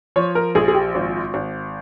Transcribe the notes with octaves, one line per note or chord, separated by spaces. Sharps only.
F3 C#5
A#4
A#1 G#4
G#4
G4
G#1
G#1